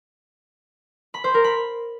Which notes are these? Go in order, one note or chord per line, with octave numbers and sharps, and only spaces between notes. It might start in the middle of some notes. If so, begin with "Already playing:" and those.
B5
C5
A#4
B5